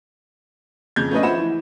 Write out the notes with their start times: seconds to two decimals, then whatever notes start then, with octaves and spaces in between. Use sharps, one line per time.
0.96 F2 C#3 G6 G#6
1.11 A3 B3 C#4 D4 B4 D#5
1.23 F3 C5 E5 F#5 B5 E7
1.38 E3